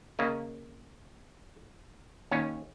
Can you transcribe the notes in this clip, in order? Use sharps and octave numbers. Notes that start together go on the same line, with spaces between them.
C#3 A#3 D#5
D#2 C#4 C#5 G#5